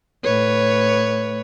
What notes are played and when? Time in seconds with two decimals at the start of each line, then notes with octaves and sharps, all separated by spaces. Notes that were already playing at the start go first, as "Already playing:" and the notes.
0.23 A2 B4 C#5